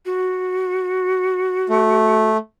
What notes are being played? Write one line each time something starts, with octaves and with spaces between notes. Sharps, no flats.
F#4
A3